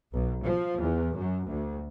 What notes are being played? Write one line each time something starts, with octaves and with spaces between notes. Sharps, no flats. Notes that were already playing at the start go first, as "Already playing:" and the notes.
B1
F3
E2
F#2
D2